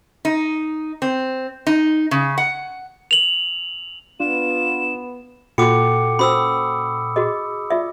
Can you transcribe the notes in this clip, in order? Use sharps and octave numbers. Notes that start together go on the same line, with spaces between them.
D#4
C4
D#4
C#3
F#5
F7 F#7
B3 D4 F4 E7
A#2 F4 F#4 A4 F#5 G5 D6 C#7
C#4 F#4 C5 B5 D#6 E6
F#4 G#4 D#5
F4 D5 E5